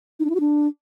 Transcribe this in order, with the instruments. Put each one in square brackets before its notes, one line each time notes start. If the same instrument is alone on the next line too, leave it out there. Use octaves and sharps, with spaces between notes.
[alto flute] D#4
D4
E4
F#4
D4